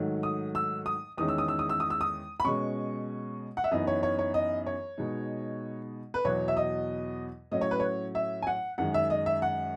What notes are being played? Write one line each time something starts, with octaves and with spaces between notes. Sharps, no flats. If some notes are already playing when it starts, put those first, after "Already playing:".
Already playing: G#2 D#3 F#3 A3
D#6
E6
D#6
E2 D#3 G#3 C#4 D#6
E6
D#6
E6
D#6
E6
D#6
E6
D#6
B5
B2 G#3 C#4 C#6
F#5
E5
F#2 E3 B3 D#4 D#5
C#5
C#5
C#5
D#5
C#5
B2 G#3 D#4
B4
E2 B2 F#3 C#5
E5
D#5
A2 F#3 C#4 D#5
C#5
B4
C#5
E5
G#5
F#5
F#2 D#3 G#3 F#5
E5
D#5
E5
F#5